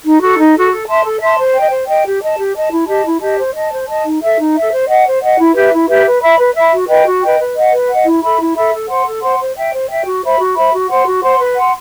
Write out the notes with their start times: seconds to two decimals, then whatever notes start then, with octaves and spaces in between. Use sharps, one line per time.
0.04 D#4
0.20 F#4 A4
0.37 D#4
0.53 F#4 A4
0.70 A4
0.87 E5 A5 C6
1.04 A4
1.20 E5 A5 C6
1.37 C5
1.53 D#5 G5
1.70 C5
1.87 D#5 G5
2.04 G4
2.20 D#5 A5
2.37 G4
2.54 D#5 A5
2.71 E4
2.87 G4 D#5 A5
3.04 E4
3.21 G4 D#5 A5
3.37 C5
3.54 D#5 A5
3.70 C5
3.87 D#5 A5
4.03 D#4
4.21 A4 E5
4.37 D#4
4.55 A4 E5
4.71 C5
4.87 D#5 F#5
5.04 C5
5.21 D#5 F#5
5.37 E4
5.55 G4 B4 E5
5.71 E4
5.87 G4 B4 E5
6.05 B4
6.21 E5 B5
6.37 B4
6.54 E5 B5
6.71 F#4
6.88 B4 D#5 G5
7.05 F#4
7.21 B4 D#5 G5
7.38 B4
7.55 D#5 F#5
7.71 B4
7.88 D#5 F#5
8.05 E4
8.22 A4 E5 B5
8.39 E4
8.55 A4 E5 B5
8.72 A4
8.88 C5 F#5 C6
9.04 A4
9.22 C5 F#5 C6
9.38 C5
9.55 E5 G5
9.71 C5
9.89 E5 G5
10.05 F#4
10.22 C5 E5 B5
10.38 F#4
10.55 C5 E5 B5
10.72 F#4
10.89 C5 F#5 C6
11.05 F#4
11.22 C5 F#5 C6
11.39 B4
11.55 F#5 C6